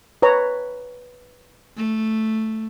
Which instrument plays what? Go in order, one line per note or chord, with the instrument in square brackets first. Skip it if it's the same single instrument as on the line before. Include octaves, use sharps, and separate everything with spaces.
[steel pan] B4 C#5 A#5
[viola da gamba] A3